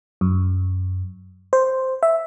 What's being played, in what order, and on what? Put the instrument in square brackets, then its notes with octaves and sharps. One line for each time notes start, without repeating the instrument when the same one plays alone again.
[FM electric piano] F#2
C5
E5